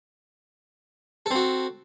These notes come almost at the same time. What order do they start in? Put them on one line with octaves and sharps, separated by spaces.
A4 C4 F#4